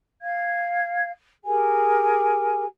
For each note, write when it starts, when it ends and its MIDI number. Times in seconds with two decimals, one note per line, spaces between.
0.21 1.10 77
0.21 1.10 92
1.44 2.64 67
1.44 2.64 68
1.44 2.64 70
1.44 2.64 80